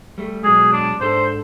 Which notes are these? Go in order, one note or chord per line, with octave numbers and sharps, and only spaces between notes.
G3 A3
B2 F#3 G#3 G#4
D4
G#2 D4 A4 C5